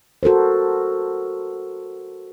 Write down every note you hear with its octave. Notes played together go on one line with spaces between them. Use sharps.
F#4 A4 A#4 C5